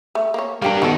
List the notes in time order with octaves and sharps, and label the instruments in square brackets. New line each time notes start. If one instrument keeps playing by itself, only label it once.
[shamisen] A3
A#3 C#5
[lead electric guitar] G3 D4 [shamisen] A#3 G4 A#4
[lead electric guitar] D#3 [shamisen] B3 F#4 A4